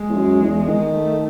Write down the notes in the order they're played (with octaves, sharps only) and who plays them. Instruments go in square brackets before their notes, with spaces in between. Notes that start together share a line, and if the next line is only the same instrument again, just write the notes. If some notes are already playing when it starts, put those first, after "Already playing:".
Already playing: [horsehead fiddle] G#3
[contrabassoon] E2
F#2
E2
D#3
[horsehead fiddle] A3